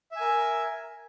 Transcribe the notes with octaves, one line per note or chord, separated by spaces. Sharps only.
A#4 E5 G#5